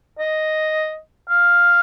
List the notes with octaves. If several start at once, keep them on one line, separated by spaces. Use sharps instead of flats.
D#5
F5